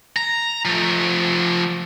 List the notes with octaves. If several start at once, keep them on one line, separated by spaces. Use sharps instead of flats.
A#5
F3 A3